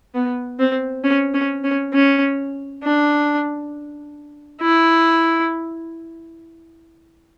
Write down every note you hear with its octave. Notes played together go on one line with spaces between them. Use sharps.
B3
C4
C#4
C#4
C#4
C#4
D4
E4